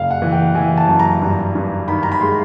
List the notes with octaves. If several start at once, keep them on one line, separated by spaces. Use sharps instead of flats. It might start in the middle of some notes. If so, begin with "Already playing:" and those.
Already playing: F#1 F5
F#5
E3
G5
E3 G#5
A5
F#2
A#5
G2
G2
D#3 B5
A#5
B5
G#3 C6